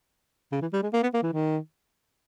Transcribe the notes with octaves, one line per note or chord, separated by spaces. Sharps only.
C#3
E3
G3
G#3
A#3
B3
A#3
E3
D#3